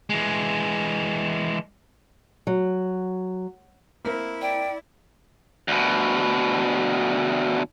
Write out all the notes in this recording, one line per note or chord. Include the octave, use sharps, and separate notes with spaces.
E3 G#3
F#3
A#3 C4 E4 A#4
D5 G5
D2 B2